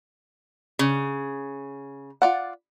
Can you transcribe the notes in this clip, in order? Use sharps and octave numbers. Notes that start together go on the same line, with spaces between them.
C#3
F4 D5 F#5